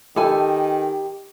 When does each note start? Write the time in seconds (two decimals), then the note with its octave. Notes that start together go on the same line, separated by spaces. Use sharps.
0.16 D#3 G4 A4 G#5 A5